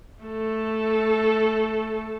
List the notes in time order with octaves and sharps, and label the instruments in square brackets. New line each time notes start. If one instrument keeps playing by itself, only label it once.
[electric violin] A3 A4